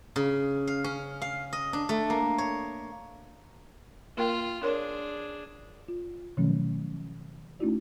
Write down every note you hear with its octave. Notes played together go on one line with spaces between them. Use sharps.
C#3
F5
C#4
F5
D#5
D4
A3
A#3
C#5
A#3 F4 A#4 G5
D4 G#4 A#4 C#5 C6
F4
B2 D#3 F3 F#3 A3 C#4
A3 C#4 D#4 E4 F#4 D5